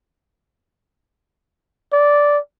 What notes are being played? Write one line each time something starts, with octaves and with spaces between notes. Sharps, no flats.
D5